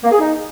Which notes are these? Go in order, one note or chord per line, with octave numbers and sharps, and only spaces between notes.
A#3
G#4
D#4